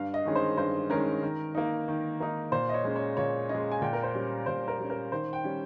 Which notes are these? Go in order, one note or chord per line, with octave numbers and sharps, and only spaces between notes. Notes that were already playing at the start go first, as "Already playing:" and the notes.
Already playing: G2 F5
D#5
D#3 G#3 C#4
C5
G2 C5
D#3 G#3 C#4 A#4
D#3
A#3 D#4
D#3
A#3 D#4
A#2 C5
D#5
C#5
G#3 C#4
C#5
A#2 C#5
G#3 C#4 D#5
G#5
A#2 G5
A#4
C5
G3 C#4
A#2 C5
A#4
G3 C#4
A#4
D#3 C5
G5
G3 C#4